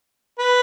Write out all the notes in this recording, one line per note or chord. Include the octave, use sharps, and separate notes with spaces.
B4